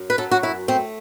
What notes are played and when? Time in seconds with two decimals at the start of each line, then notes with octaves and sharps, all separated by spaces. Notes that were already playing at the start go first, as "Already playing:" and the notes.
Already playing: F#2
0.10 B4
0.18 F#3 A4
0.31 F#4
0.43 F#2 E4
0.68 A3 C4